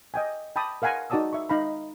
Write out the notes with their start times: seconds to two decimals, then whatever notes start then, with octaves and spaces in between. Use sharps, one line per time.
0.14 D#5 G5 G#5
0.56 G5 A5 B5 D6 D#6
0.82 A#4 F5 F#5 G#5 A#5 C6
1.10 D#4 F#4 D5 A5 D#6 E6
1.33 E5 C#6
1.49 D#4 F5 A#5 B5